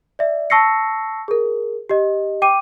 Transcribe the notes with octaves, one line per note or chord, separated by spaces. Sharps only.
D5 E5
A5 C#6 E6 A#6 C7 C#7
G#4 A#4
G4 D#5
G5 D6 D#7